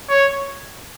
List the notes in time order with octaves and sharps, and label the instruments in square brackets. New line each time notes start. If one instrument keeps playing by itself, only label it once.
[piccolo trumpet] C#5